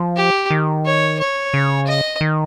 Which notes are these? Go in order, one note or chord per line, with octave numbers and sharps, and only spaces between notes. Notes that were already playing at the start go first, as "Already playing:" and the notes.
Already playing: F3
G4
D#3
C#5
C#5
C#3
D#5
D#3